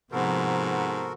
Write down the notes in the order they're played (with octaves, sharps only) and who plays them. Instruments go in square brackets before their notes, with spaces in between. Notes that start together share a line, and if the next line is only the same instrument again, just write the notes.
[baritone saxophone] G#2 [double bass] C3 F3 [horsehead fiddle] B3 C5 [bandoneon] F#4 A4 A#4